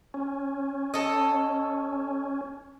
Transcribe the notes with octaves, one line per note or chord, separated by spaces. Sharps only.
C#4
A4 D#5